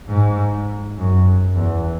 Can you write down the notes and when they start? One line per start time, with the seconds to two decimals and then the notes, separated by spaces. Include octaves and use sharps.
0.08 G#2
0.97 F#2
1.56 E2